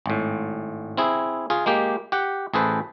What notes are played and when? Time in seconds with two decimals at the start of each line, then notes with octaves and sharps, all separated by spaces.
0.06 G#1 A2
0.97 C4 E4 G#4
1.50 F4 G#4
1.66 G#3 A#3 G4
2.12 G4 F#5
2.54 A1 G#4 A4 B4 C5